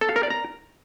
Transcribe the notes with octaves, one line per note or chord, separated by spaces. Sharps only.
A4
F5
A#4
D5
A#5